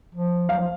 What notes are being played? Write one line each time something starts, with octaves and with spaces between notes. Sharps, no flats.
F3
F#3 F5
F3